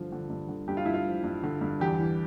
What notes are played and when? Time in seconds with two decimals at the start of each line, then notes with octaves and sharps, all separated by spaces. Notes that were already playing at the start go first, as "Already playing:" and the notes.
Already playing: G2 D3 F3
0.12 D3
0.30 G2
0.49 D3
0.68 G2 G4
0.77 F4
0.85 G2 E4
0.94 F4
1.06 F3
1.24 G2
1.43 D3
1.61 G2
1.80 E2 G4
1.99 E3